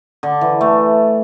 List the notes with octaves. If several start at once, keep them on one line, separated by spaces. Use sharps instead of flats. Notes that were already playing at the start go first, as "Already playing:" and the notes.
D3
E3
A3